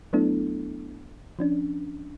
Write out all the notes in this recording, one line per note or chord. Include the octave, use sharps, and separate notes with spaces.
F#3 A3 B3 D4 E4 A4
F3 C#4 D4